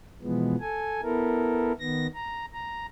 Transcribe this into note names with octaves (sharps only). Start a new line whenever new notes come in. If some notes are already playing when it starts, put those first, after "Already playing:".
B2 E3 F3 G#3 B3
A4 G#5
B3 E4 A4 A#4
D#3 B3 A#6
A#5
A#5